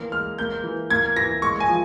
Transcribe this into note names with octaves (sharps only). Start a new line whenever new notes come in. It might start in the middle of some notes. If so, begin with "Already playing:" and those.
Already playing: E3 A#3
G#3 F6
A#3 G6
E3
A#3 G#6
E3 A#6
G#3 C#6
G#5
F3